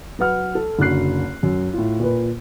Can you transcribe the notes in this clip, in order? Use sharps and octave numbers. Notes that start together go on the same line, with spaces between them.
F#3 B4 F#5 F6
A4
F#1 D3 F#4 F#6 C7
F#2
A2 F4
A#2 B4